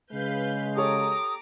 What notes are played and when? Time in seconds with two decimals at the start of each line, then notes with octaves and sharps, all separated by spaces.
0.12 C#3 G#3 B4 F5 G6
0.77 G4 A4 C#5 A#5 D6 D#6